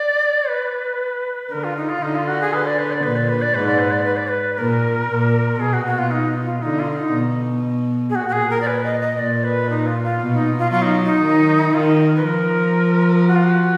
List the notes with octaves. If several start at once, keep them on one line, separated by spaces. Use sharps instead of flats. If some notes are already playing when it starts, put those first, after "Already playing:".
Already playing: D5
B4
D3 A#4
F4
D#4
F4
D3 D#4
F4
F#4
G#4
B4
D5
B4
D5
A#2 B4
D5
B4
D5
G#2 B4
D5
B4
D5
B4
D5
B4
A#2 A#4
A#2
B2 G#4
F#4
F#4
F4
D#4
F4
D3 D#4
F4
D#4
B2
G#4
A#2 F#4
F#4
G#4
A#4
D5
B4
D#5
D#5
A#2 D5
B4
D#4
F4
F4
B2
D#4
F4
F#3 F4
D#4
D#4
D#3
D#3 F4
A#4
B4
F3 A#4
F#4
F4
F#4